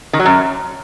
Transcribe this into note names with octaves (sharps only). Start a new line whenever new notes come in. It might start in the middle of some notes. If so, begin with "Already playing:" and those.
D#3
F#3
F#2